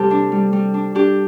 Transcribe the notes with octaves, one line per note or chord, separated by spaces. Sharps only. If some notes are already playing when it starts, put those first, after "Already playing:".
Already playing: C3 G3 G4 A4
D4
G3
G3
D4
D4 G4